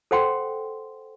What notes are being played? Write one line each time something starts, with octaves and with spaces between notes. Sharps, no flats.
A4 C5 F#5 G5 C6